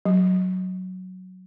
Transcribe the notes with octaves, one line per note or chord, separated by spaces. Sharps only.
F#3